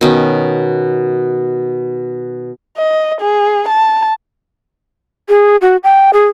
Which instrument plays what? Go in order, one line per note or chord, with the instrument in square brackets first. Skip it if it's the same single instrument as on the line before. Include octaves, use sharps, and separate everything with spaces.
[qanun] B2 D#3 C#4
[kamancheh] D#5
G#4
A5
[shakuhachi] G#4
F#4
G5
G#4